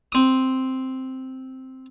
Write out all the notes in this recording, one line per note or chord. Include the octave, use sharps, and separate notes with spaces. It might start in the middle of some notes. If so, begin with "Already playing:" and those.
C4 D#6